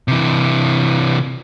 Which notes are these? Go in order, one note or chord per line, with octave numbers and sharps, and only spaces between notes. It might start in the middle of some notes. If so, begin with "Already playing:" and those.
C3 E3